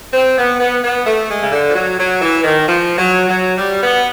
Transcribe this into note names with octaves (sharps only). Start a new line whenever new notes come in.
C4
B3
B3
B3
A3
G#3
C#3
D3
F3
F#3
F#3
E3
D#3
F3
F#3
F#3
G3
B3